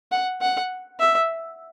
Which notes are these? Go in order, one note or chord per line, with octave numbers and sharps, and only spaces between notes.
F#5
F#5
E5